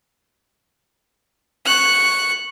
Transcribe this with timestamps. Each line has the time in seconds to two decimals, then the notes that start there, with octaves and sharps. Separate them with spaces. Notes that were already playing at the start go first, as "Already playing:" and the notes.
1.66 C#6 F#6